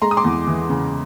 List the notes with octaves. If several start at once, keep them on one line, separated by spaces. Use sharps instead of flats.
G#3 A#5 C6
D#6
C6 D6
E2
E3
C#3